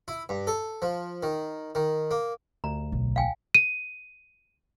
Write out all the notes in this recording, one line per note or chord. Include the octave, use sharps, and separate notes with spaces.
E4
G2
A4
F3
D#3
D#3
A#3
D2 A#5
B1
F5 G5 G#5
D#7